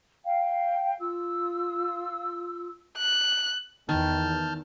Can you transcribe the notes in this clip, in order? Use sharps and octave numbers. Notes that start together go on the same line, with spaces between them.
F5 G5
F4 E6
F#6
E2 D#3 A5 F6 G6